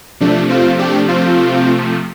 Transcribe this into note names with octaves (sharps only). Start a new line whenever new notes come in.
C3 F3 A3 D4
C4 F4
D4 G4
C4 F4